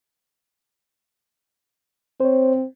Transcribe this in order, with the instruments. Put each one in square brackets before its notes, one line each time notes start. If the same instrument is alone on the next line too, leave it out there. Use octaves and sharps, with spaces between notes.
[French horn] C4 [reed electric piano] C5 C#5